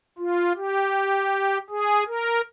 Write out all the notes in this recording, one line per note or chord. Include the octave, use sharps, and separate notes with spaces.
F4
G4
G#4
A#4